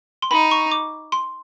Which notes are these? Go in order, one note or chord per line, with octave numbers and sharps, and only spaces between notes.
C6
D#4 B5
C#6
D6
C6